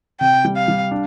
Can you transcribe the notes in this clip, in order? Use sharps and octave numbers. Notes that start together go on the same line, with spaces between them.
C3 G5
G3
F5
G3
D4